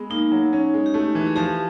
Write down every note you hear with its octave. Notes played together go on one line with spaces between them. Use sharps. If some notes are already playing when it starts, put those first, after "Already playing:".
Already playing: G#3 B3
A#3 D#4
F#3
C#4
G#3
G4
A3 F#4
E3
G#4
F3 G4